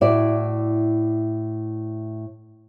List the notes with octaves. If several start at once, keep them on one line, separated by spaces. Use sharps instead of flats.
A2 E4 F#4 D5